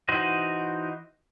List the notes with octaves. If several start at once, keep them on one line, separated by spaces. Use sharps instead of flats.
E3 D#4 F#4 C5 D#5